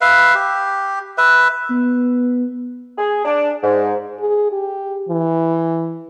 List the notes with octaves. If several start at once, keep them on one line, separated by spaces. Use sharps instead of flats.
B4 E5 F5
G4
B4 E5
B3
G#4
D4
G#2
G#4
G4
E3